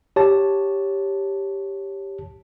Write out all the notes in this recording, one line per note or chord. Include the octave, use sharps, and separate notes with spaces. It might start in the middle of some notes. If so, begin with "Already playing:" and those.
G4 C#5 A5